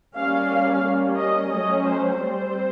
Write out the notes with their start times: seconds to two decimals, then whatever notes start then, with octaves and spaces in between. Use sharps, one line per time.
0.16 G3 A#3 C#4 F5
0.50 F5
0.83 G3 A#3 C#4
1.17 D#5
1.49 F#3 A3 C#4 D#5
1.84 C5
2.16 G3 C4 C5